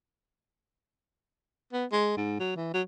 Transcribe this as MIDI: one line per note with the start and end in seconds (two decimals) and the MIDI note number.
1.73 1.85 59
1.92 2.12 56
2.17 2.36 44
2.40 2.53 54
2.56 2.72 52
2.74 2.82 54